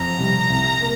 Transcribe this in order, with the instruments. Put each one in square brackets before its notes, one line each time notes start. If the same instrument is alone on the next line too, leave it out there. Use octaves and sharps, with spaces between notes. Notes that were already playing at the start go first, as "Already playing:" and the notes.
Already playing: [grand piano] F2 [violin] A#5
[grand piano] C3 G3
C2
A#3